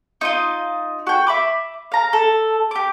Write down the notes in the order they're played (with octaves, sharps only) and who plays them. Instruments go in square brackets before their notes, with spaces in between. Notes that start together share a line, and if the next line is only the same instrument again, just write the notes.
[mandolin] D#4 F4 D#5
F#4 G5
E5 B5 D6
F5 A#5
A4
G4 D6